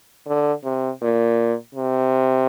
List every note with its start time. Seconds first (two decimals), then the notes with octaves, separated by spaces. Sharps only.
0.26 D3
0.64 C3
1.01 A#2
1.75 C3